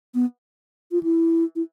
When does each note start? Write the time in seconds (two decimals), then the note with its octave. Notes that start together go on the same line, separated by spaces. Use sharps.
0.15 B3
0.92 F4
1.03 E4
1.56 E4